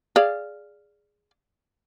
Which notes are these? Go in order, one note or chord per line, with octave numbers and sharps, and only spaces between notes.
G#4 D5 F5